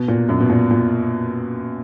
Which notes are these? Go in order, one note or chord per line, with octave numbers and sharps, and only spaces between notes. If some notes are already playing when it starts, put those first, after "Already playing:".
Already playing: B2
A#2
F#2
B2
A#2
A#2